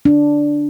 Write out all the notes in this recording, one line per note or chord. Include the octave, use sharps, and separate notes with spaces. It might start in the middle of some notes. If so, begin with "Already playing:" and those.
D4